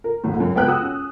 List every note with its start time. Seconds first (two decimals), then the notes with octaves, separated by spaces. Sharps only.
0.04 A#4
0.24 F#1 D2 A2
0.36 C#2 F#2
0.55 C#2 B3 G5 F#6
0.68 F#4 D#6 E6
0.82 C#4